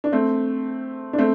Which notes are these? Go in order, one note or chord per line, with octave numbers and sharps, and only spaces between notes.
D4
A3 C4
D4
A3 C4